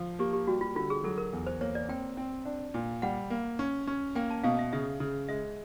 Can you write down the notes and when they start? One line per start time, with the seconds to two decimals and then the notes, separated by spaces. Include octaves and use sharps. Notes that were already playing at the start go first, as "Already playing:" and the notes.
Already playing: F3
0.19 A#3 G4
0.33 G4
0.47 G3 F#4
0.61 F4
0.76 D3 F4
0.90 G#4
1.04 F#3 A4
1.18 A#4
1.33 E2
1.47 C5
1.61 A#3 C#5
1.75 D5
1.88 C4 G5
2.17 C4
2.45 D4
2.74 A#2
3.02 G3 F#5
3.30 A#3
3.59 C#4
3.87 C#4
4.15 A#3 G5
4.31 A5
4.44 B2 F5
4.59 E5
4.73 C#3 E5
5.00 C#3
5.28 G#3 E5